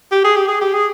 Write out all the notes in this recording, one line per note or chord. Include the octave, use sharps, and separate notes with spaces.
G4
G#4
G4
G#4
G4
G#4